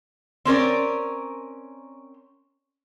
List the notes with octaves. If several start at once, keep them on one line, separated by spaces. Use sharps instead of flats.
C4 C#4 A#4 D5